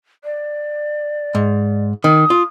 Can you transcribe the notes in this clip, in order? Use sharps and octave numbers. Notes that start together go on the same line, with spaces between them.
D5
G#2
D#3 D#6
F4